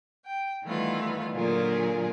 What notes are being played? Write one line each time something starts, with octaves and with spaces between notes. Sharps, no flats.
G5
D#3 E3 G3 A3 B3 F4
A#2 D3 F#3 F4 G#4 A#4